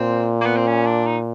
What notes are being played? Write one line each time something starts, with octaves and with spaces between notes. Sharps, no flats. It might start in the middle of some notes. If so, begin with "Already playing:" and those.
Already playing: A#2 C4
A#3
B3
C4
C#4
D4
D#4